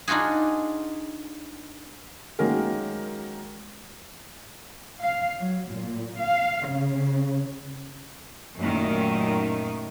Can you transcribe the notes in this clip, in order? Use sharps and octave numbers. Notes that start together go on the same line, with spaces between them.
D4 D#4 F4 F#4 G#4
D#3 F#3 G#3 A#3 C#4 A#4
F5
F#3
A#2
F5
C#3
F#2 A#2 D#3 A3